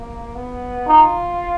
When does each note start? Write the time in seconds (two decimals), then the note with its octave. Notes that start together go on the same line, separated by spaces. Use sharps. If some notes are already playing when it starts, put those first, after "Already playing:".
Already playing: A#3
0.35 B3
0.87 D#4 F4